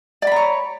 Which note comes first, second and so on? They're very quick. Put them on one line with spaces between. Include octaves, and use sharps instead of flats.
D5 B5 A#5 C#5